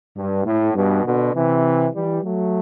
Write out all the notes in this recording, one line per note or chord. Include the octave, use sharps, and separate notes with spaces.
G2
A2
G2 B2
B2 D3
C3 E3
E3 G3
F#3 A3